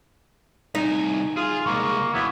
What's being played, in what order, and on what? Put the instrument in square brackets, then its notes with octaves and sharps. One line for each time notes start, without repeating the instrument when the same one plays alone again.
[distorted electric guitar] C2 G#5 [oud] D#4
[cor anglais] F4 [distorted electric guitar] G#4
[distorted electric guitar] C2 G#3 [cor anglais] A#3 [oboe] C#6
[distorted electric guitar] F#2 [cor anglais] B3 [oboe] E4